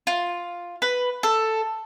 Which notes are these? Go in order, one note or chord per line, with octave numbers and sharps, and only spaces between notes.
F4
B4
A4